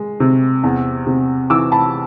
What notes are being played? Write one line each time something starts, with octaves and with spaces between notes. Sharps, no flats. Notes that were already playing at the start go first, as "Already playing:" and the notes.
Already playing: G#3
C3
E2
C3
E3 D6 E6
A5 B5